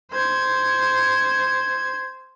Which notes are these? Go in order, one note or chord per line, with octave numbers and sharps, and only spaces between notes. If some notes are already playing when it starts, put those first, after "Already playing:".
C5 G#6